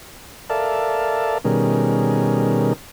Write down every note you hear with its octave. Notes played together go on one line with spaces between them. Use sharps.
A4 A#4 D5 E5 F5 A5
B2 D#3 G3 C#4 G#4 A#4